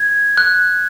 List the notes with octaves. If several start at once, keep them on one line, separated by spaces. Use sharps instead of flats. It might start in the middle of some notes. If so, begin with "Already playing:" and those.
Already playing: G#6
F#6